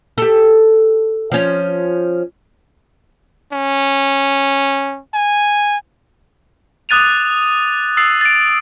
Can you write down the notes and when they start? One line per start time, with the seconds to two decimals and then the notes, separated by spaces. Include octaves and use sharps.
0.18 G4 A4
1.32 F3 C#4
3.52 C#4
5.14 G#5
6.89 D6 D#6 F#6 A6 D#7 F7
7.97 D#6 E6 A6 C7
8.21 A6 D7